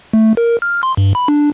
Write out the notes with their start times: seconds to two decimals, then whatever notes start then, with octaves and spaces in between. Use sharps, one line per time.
0.13 A3
0.37 A#4
0.62 F6
0.83 C6
0.97 G2
1.15 B5
1.28 D4